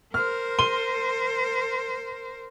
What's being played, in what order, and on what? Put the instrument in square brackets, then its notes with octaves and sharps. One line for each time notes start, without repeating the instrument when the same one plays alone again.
[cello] A#4 C5 [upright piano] F6
[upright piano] C6 D#7 G7